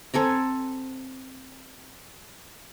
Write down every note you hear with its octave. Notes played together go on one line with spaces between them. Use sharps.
C4 A4 G#5 A#5